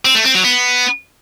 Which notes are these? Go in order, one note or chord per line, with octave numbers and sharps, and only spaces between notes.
C4
A3
C4
F#3
B3